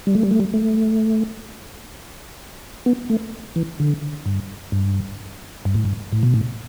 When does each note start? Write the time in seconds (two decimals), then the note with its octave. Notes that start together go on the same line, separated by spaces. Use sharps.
0.07 G3
0.15 A3
0.23 G3
0.31 A3
0.40 G3
0.54 A3
2.86 B3
3.10 A3
3.56 E3
3.80 D3
4.26 G2
4.72 G2
5.65 G2
5.75 A2
5.85 G2
6.12 A2
6.23 B2
6.34 A2